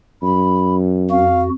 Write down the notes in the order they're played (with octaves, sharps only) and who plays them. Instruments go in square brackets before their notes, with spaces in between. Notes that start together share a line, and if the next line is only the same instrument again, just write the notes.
[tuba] F#2 [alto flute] B5
[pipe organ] F2 F#4 [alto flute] F5